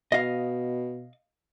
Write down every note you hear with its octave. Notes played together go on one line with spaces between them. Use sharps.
B2 D#5 F5